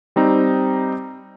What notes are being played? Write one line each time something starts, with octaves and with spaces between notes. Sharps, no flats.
G3 C4 D#4